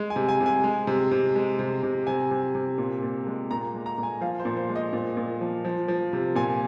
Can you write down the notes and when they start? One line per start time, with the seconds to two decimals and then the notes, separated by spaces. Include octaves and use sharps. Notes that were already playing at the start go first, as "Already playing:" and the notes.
Already playing: G#3
0.10 G#5
0.16 C3
0.28 G#5
0.41 C3
0.46 G#5
0.64 G#3
0.87 C3
1.11 C3
1.36 G#3
1.59 C3
1.83 C3
2.07 C3 G#5
2.31 C3
2.55 C3
2.78 A#2
3.02 A#2
3.27 G#3
3.50 A#2 A#5
3.74 G#3
3.86 A#5
3.98 A#2
4.03 G#5
4.21 F3 F5
4.40 C5
4.45 A#2
4.57 C5
4.69 G#3
4.76 D#5
4.93 A#2
5.17 A#2
5.41 F3
5.65 F3
5.88 F3
6.13 C3
6.36 A#2 G#5